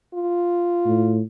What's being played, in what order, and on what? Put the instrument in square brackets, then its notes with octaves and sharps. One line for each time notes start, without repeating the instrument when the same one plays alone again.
[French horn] F4
[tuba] A2